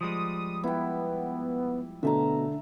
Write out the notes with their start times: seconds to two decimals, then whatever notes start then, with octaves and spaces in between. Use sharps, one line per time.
0.01 F3 G3 G#3 D#6
0.64 B3 E4 G5
2.03 B2 D3 A3 E5 A5 A#5